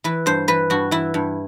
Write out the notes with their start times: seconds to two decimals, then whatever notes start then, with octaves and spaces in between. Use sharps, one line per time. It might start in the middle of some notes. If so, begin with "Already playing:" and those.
0.04 E3 B4
0.26 G2 C5
0.48 E3 B4
0.70 G2 F#4
0.91 E3 E4
1.14 G2